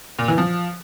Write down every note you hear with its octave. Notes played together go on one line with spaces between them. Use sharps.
A#2
E3
F3